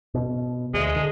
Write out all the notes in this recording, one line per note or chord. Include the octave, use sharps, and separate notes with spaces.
B2
D2 G#3
D3